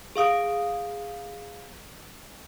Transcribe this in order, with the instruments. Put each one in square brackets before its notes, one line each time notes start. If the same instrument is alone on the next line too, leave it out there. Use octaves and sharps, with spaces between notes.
[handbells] G#4 F5 D#6 D7